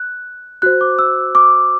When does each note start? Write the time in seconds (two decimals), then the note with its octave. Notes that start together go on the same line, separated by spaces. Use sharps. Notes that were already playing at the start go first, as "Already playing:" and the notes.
Already playing: F#6
0.62 F#4 C5 F#6
0.81 D6
0.99 E6
1.35 D6